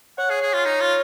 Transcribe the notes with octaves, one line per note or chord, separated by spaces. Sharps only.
C#5 F#5
G#4
G#4
F4
D#4
F4